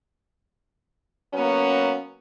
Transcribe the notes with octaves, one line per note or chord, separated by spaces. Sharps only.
F#3 A#3 B3 C#4